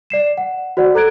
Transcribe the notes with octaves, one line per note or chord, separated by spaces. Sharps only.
D5 C7 E7
F#5
F#4 C5 D5 F#5
A4 A#5 F#6 G#6 D7